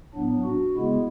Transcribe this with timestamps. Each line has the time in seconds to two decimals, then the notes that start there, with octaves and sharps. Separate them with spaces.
0.14 A2 F#3 B3 D4
0.44 F#4
0.75 C#3 G#3 B3 E4